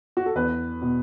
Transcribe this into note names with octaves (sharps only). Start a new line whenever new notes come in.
F#4
A4
E2 B4
B2